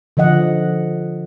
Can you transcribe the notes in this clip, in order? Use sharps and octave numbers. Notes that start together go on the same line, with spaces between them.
D3 F3 D#5 F#5